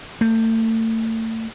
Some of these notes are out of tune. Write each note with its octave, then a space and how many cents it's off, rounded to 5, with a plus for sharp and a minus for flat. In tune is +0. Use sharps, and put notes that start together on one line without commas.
A3 +35